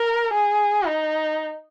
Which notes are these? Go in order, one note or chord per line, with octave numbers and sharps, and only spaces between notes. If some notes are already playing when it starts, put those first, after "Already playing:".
Already playing: A#4
G#4
D#4